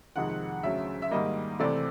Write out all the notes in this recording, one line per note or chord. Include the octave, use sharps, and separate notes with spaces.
F2 C3 D#3 G#3 F#5
D2 C#3 F#3 E5
E5
G#2 D#3 G3 A#3 D#5
C3 E3 A3 C4 D5